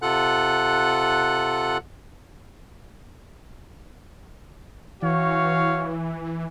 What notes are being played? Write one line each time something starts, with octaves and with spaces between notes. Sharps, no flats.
C3 F4 A4 F#5 F#6
E3 F#4 C#5 F5